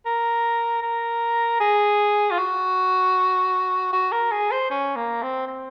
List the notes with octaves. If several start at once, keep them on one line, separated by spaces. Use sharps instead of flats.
A#4
A#4
G#4
F4
F#4
F#4
A#4
G#4
C5
C#4
A#3
C4
C4